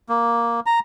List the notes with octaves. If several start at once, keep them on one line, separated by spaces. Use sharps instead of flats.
A#3
A#5